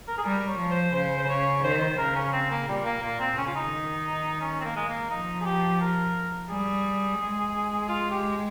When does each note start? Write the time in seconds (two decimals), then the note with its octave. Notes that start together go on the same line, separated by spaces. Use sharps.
0.08 A#4
0.18 G#4
0.24 G3 A#4
0.48 C#5
0.60 F3
0.71 C5
0.94 C#3 C5
1.19 C5
1.29 C#3 C#5
1.63 D#3 C5
1.81 C5
1.98 C#3 A#4
2.15 C#4
2.33 C#3 C4
2.50 A#3
2.68 A#2 G3
2.85 A#3
3.02 A#2 A#3
3.20 C4
3.37 C#3 C#4
3.47 F4
3.55 D#4
3.72 D#3
4.41 C#4
4.60 C4
4.64 A#3
4.76 G#3
4.88 A#3
5.10 F3 D#4
5.41 G#4
5.45 G4
5.81 A#4
6.49 G3 G#4
7.19 G#3
7.89 F4
8.11 G4